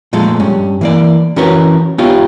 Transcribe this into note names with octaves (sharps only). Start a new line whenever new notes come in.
A#2 F3 G#3 A3 A4
G2 C#4
E3 A#3 D5
E3 C#4 F#4 A#4 B4 C#5
B3 D#4 F4 G4 C#5 F5